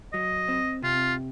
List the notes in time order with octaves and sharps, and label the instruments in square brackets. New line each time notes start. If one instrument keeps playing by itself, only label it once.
[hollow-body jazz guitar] F#3 [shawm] D#5
[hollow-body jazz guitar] C4
[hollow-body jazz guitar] C3 [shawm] F4